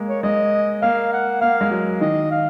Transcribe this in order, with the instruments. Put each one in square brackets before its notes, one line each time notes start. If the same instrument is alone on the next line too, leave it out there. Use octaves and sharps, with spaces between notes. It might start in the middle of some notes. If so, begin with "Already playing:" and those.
Already playing: [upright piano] G#3 A#3
[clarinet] C#5
[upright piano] G#3 [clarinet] D#5
[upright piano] A#3 [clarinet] F5
[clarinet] F#5
[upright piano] A#3 [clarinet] F5
[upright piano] G#3
F#3
[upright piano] D#3 [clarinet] D#5
[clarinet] F5